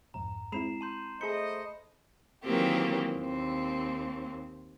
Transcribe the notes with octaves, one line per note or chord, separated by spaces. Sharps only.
B1 F2 G#2 A#5
G#3 C4 E4 B5 C7 E7
A5 C6 G6
A3 G#4 C5 D#5 A5 B5 G6 C#7
D#3 E3 F#3 A#3 C4 G4
D#2 C4